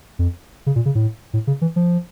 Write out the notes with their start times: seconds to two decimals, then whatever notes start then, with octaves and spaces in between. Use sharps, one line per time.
0.19 F2
0.66 C#3
0.76 A#2
0.86 C#3
0.95 A2
1.33 A2
1.47 C#3
1.61 E3
1.76 F3